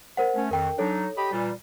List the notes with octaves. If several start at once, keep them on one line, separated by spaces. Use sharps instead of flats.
A#4 C5 F#5
A3 C#4
F2 D#3 A#4 G5
F#3 D4 D#4 A4 C#5
G4 D#5 B5
A#2 E3 G3